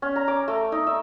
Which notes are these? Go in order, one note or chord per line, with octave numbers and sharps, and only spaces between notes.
C#4
A#5
D6
A3
D#4
E5